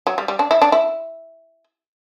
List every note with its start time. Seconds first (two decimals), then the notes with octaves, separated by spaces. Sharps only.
0.07 F#3
0.18 G3
0.28 G3
0.39 D4
0.51 E4
0.62 D4
0.72 E4